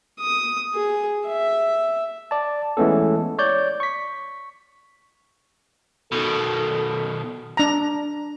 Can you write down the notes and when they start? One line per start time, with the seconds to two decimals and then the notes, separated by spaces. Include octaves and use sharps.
0.20 D#6
0.74 G#4
1.26 E5
2.31 D5 A5
2.77 E3 G#3 A3 B3 C#4 A4
3.39 C#5 D5 G6
3.80 C#6 B6
6.12 B2 D#3 A4
7.57 D4 A#5